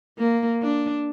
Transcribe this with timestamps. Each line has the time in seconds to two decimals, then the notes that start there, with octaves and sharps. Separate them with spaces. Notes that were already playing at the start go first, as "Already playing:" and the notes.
0.18 A#3
0.62 D4